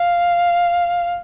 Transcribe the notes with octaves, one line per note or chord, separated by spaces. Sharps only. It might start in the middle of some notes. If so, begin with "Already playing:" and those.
Already playing: F5